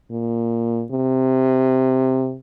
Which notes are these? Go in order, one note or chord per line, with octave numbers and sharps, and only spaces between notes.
A#2
C3